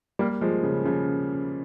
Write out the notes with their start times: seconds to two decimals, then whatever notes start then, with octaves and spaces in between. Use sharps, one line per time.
0.19 G3 A#3
0.41 F3 G#3
0.63 C#3
0.85 C#3 F3